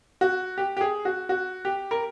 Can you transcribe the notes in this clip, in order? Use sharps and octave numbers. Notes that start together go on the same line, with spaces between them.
F#4
G4
G4
G#4
F#4
F#4
G4
A#4